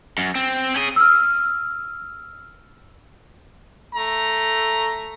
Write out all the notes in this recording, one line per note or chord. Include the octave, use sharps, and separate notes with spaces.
F#2
C4
C#4 G#4
E6 F6
A3 A#5